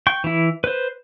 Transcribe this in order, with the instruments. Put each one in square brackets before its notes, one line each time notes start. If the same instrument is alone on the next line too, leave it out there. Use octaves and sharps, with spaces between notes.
[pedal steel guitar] G5 C#6
E3 E4
B4 C5